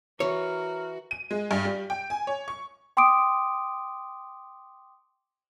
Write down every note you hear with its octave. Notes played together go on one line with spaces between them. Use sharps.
E3 F#4 A#4 C#5
D#7
G#3
G2
G3
G5
G#5
C#5
C#6
G5 C6 D6 D#6 D7